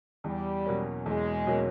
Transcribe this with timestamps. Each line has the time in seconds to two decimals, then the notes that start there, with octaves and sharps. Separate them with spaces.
0.24 E2 G3
0.66 B2 F#3 A#3 C#4
1.06 E2 G#3
1.47 B2 F#3 A#3 C#4